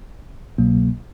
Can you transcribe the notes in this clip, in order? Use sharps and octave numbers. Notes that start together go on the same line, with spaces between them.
C2 B2 F#3 A#3